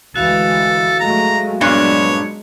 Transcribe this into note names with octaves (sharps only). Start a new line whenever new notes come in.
D2 E3 G#3 F#4 A4 F5
F#3 G#3 A3 A#5
G2 A#2 F#3 G#3 B3 D4 C#5